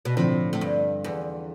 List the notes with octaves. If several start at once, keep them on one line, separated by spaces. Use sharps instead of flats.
B2
A2 D3 F3 C4
A2
G2
E2